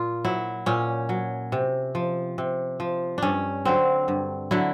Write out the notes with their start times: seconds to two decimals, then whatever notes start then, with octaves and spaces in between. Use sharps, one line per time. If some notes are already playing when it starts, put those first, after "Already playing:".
Already playing: A#2 F4
0.25 F#3 E4
0.66 A#2 C#4
1.09 F#3
1.52 C3
1.95 F3
2.38 C3
2.80 F3
3.18 G2 C#4 D4
3.65 D3 F#3 C4
4.08 G2
4.51 D3 F#3 E4